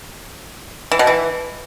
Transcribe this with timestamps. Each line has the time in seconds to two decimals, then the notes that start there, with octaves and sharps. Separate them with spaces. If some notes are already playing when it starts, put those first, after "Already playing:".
0.92 E3
0.99 B2
1.07 E3